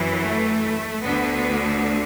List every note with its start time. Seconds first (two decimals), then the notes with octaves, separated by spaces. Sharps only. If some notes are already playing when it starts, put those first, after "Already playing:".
Already playing: F#2 E3
0.21 A3
1.03 D2 D3 B3